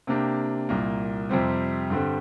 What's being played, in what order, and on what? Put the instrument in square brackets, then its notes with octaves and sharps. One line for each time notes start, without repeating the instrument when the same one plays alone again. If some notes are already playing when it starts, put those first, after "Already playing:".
[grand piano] C3 A#3 D4 G4
C2 A#2 A#3
F2 C3 G3 C4
G2 D3 G3 C4